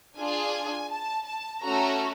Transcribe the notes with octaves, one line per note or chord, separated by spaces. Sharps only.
D4 F4 G#4 G#5
A5
A5
A3 C#4 F#4 A4 A#5